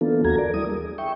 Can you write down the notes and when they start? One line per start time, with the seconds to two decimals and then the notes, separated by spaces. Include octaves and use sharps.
0.01 E3 A#3 B3 D4 F4 A4
0.24 D#2 E3 F#4 A4 A#5 G#6
0.38 A#4 D5
0.54 G3 E4 D#6
0.70 G#4
0.98 E5 G5 C#6